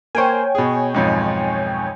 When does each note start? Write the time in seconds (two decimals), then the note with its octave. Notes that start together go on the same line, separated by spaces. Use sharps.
0.15 A#3 C5 C#5 G5 G#5
0.55 B2 G#4
0.94 B1 F2 G#2